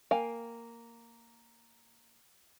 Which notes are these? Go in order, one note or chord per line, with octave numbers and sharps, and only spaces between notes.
A#3 F5 G5 G#5